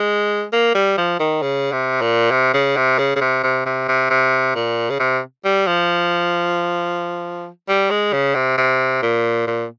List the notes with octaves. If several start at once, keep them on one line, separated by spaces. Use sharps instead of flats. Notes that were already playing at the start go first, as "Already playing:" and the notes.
Already playing: G#3
A#3
G3
F3
D#3
C#3
C3
A#2
C3
C#3
C3
C#3
C#3
C3
C3
C3
C3
C3
A#2
C#3
C3
G3
F3
G3
G#3
C#3
C3
C3
A#2
A#2